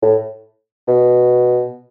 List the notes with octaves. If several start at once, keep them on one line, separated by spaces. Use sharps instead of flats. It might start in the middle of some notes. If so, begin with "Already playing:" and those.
A2
B2